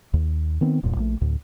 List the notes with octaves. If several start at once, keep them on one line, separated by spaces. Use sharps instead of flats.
D#2
D#3 B3 C4
D1 E2 G2 A#2
A#1 A3
D2 A2